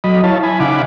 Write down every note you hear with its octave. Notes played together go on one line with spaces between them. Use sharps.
F#3 D#5 B5
E4 C#5 F5 A5
E4 G#5 B5
C#3 D#4 F5 F#5 B5 D6